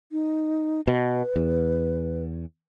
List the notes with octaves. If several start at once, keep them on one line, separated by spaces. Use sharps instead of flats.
D#4
B2 B4
E2